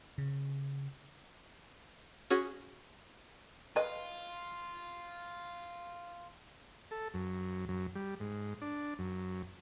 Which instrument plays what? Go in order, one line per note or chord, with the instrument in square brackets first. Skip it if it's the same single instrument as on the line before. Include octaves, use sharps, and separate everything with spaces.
[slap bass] C#3
[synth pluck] C#4 F#4 G#4
[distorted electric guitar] F4 [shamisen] B4 D#5
[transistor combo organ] A4
F#2
F#2
G3
G#2
D4
F#2